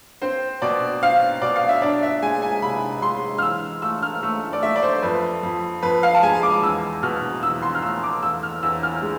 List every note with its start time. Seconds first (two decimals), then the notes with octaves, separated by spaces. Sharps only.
0.22 C4 C5
0.62 B2 D5
1.03 C4 F5
1.42 B2 D5
1.56 F5
1.69 E5
1.82 D4 D5
2.03 E5
2.22 G#3 G#5
2.42 G#5
2.62 C3 B5
3.02 G#3 C6
3.38 F6
3.42 E3 E6
3.82 A3 E6
4.02 F6
4.23 A3 E6
4.53 D5
4.63 A3 E5
4.76 D5
4.83 C5
5.03 F2 B4
5.43 F2
5.83 F2 B4
6.03 F5
6.14 A5
6.23 G#3 G#5
6.43 D6
6.63 E2 E6
7.03 B2 F6
7.43 E2 E6
7.62 C6
7.75 F6
7.83 A3 E6
8.03 D6
8.23 E2 E6
8.43 F6
8.63 E2 E6
8.83 F6
9.02 G#3